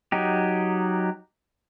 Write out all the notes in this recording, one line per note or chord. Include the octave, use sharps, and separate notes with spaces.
F#3 D#4 G4